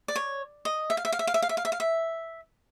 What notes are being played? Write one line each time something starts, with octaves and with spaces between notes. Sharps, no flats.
D5
C#5
D#5
E5
F5
E5
F5
E5
F5
E5
F5
E5
F5
E5
F5
E5